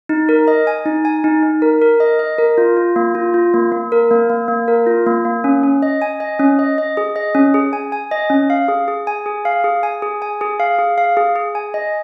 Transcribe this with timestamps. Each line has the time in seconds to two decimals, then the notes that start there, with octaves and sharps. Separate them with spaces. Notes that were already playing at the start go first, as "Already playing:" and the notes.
0.09 D#4
0.29 A#4
0.48 D#5
0.67 G#5
0.86 D#4
1.05 G#5
1.24 D#4
1.43 D#4
1.62 A#4
1.82 A#4
2.00 D#5
2.19 D#5
2.38 A#4
2.58 F4
2.77 F4
2.96 A#3
3.15 F4
3.34 F4
3.54 A#3
3.72 A#3
3.92 A#4
4.11 A#3
4.30 A#3
4.48 A#3
4.68 A#4
4.87 F4
5.06 A#3
5.25 A#3
5.44 C#4
5.63 C#4
5.82 D#5
6.02 G#5
6.20 D#5
6.39 C#4
6.59 D#5
6.78 D#5
6.97 G#4
7.16 D#5
7.35 C#4
7.54 G#4
7.73 G#5
7.92 G#5
8.11 D#5
8.30 C#4
8.50 F5
8.68 G#4
8.88 G#4
9.07 G#5
9.26 G#4
9.45 F5
9.64 G#4
9.83 G#5
10.02 G#4
10.22 G#5
10.41 G#4
10.60 F5
10.78 G#4
10.98 F5
11.17 G#4
11.36 G#4
11.55 G#5
11.74 D#5